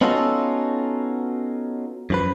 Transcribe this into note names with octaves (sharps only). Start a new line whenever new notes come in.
B3 C#4 D#4 F4 F#4 A4
F#2 F3 B4